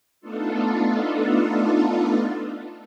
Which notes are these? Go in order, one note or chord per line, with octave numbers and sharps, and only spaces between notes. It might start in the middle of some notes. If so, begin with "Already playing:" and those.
A3 B3 D4 D#4 F4 A4